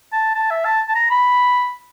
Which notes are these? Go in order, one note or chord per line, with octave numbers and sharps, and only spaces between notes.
A5
A5
E5
A5
A5
A#5
B5